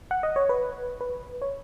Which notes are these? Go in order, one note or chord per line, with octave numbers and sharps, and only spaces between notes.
F#5
D#5
C#5
B4
B4
C#5